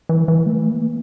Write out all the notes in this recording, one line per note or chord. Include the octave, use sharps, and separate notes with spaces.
E3
E3
A3
A#3